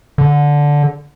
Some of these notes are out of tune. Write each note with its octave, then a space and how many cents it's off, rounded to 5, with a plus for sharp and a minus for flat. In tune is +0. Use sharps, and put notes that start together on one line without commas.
D3 -10